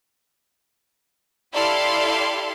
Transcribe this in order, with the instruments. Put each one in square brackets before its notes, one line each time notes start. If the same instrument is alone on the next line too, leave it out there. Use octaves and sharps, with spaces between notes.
[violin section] E4 G4 A4 D5 F5 C6